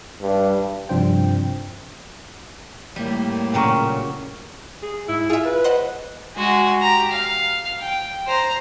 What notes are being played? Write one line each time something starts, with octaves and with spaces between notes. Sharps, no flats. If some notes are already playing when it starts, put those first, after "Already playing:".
G2
G2 C3 F3 D4 C5 G5
A2 G3 A#3
A#2 C#3 F#3 G5 A#5 C#6
G#4
G#2 E4
F4 G#4 E5
B4
C5 D#5 F#5
G#3 F#4
G4 A#5
F5
G5
C5 A#5